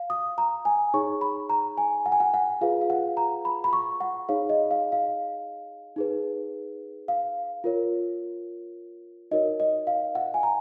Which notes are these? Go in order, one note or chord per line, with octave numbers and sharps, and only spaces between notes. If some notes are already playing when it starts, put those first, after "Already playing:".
Already playing: F5
D#6
A#5
G#5
D#4 G#4 C#5 C#6
B5
A#5
G#5
F#5
G#5
F#5
F#5
F4 G#4 B4 F5
F5
F#5
A#5
B5
B5
C#6
F#5
D#4 G#4 C#5 F5
D#5
F5
F5
D#4 G#4 B4
F5
F4 A#4 C#5
D#4 F#4 A#4 C#5 D#5
D#5
F5
F#5
G#5
A#5